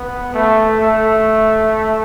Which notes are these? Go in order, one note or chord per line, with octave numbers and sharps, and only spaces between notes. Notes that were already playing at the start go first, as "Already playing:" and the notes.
Already playing: B3
A3
A3